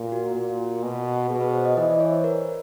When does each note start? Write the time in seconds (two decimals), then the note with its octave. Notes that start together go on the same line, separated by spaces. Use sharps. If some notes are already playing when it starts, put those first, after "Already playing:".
Already playing: A#2
0.12 F#4
0.36 A#2
0.83 B2
1.30 B2 G#4
1.41 B4
1.53 C5
1.65 D#5
1.77 E3 D#5
1.89 D5
2.00 C#5
2.12 C5
2.24 A#4